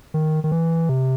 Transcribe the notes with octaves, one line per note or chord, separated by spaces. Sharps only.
D#3
D#3
E3
C3